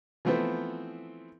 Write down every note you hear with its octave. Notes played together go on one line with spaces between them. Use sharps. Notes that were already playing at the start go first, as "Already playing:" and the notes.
E3 F3 A3 B3 C4